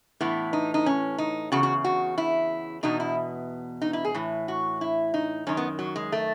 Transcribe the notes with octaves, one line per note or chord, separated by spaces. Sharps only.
A2 E3 B3
D#4
D#4
C#4
D#4
E2 C#3 F#4
F#4
F#4
E4
E2 B2 D#4
E4
D#4
E4
G#4
A2 E3
F#4
E4
D#4
F#2 D#3 C#4
B3
F#3
G#3
A3